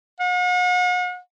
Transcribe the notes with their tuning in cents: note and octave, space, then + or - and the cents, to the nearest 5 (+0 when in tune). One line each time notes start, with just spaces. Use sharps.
F#5 -45